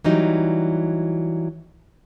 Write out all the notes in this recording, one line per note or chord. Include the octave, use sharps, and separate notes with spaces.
E3 F#3 G3 D#4